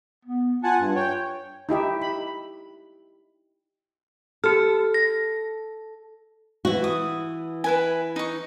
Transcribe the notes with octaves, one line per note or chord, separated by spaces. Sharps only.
B3
F4 F#5 G#5 A5
G2
C#5 G5
D#4 E4 G4 E5
B5
G4 A4 F6
A#6
E3 F#4
D#6
E4 B4 G#5
D#4 C#6